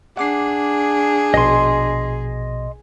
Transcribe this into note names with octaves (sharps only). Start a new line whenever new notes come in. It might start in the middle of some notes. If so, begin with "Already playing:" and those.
D4 G#4 F#5 D6 C7
A#1 B2 D#5 C6